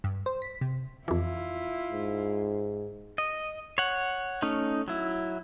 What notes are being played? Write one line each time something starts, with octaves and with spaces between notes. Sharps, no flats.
G2
C5
B6
C3
F2 E3 E4 F4
G#2
D#5
C#5 F#5
A3 C#4 D#4
F#3 E4